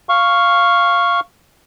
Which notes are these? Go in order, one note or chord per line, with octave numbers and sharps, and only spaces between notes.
F5 C#6